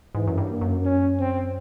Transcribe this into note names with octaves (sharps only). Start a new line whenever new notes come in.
G#2 E3
F#2
G2
A#3
F#2
C#4
C4